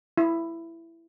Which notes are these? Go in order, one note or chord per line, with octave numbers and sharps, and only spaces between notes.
E4